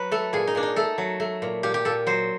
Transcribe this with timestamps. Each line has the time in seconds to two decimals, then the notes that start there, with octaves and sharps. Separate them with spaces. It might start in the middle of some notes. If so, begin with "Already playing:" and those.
Already playing: F#3 B4
0.11 A3 A4
0.33 A#2 G#4
0.47 D#4
0.55 A#2 D4
0.63 D#4
0.76 A3 A4
0.98 F#3
1.20 A3
1.42 A#2
1.63 A#2 G4
1.74 G4
1.85 A#2 A4
2.06 F#3 C5